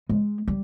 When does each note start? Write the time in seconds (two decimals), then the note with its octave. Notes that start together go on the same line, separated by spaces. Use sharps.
0.09 G#3
0.48 G3